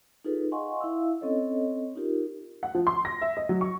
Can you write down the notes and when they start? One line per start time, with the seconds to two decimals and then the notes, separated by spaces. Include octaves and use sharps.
0.25 D#4 F4 G#4 A4 B4
0.52 D#5 F5 F#5 G#5 C6 C#6
0.80 E4 E5 F5 E6
1.21 C4 C#4 A4 C#5 D#5
1.96 D#4 F4 G4 A#4
2.63 F#5
2.75 F3
2.87 C6
3.05 A#6
3.22 E5
3.37 D#5
3.49 F#3
3.61 C#6